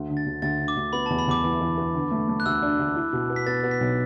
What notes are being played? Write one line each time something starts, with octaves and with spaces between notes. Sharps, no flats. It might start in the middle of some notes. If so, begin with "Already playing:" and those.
Already playing: D2
D3
A6
D2
D2 A6
D3
D6
D2
B3 B5
A5
E2
B5
E2 D6
E3
E3
B3
D3
A3
A3
F#6
D2 E6
D4
D2
E4
B2
B3
B6
B3 A6
B3
B6
B1